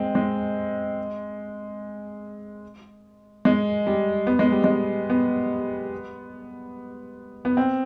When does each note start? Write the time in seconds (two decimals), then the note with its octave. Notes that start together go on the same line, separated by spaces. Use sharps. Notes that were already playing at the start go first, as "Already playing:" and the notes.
Already playing: G#3 C4
0.15 G#3
3.45 G#3
3.87 G3
4.27 B3
4.39 G#3
4.52 G3
4.64 G#3
5.10 B3
7.45 B3
7.57 C4